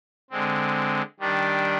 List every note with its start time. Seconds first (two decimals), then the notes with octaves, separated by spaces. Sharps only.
0.30 D3 G#3 C4
1.20 D#3 G3 D4